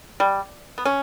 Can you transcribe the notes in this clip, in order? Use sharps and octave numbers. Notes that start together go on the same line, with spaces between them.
G3
B3
C#4